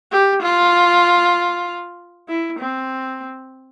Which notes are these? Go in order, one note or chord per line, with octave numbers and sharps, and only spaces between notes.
G4
F4
E4
C4